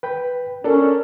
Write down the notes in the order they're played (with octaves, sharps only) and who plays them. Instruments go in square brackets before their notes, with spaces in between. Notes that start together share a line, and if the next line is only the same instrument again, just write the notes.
[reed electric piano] B4 G5 B5
[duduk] C#4 [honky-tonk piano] D4 A4 [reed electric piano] A#4